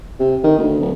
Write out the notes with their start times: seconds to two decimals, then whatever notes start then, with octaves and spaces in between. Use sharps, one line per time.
0.20 C3
0.44 D#3
0.58 D2
0.80 D1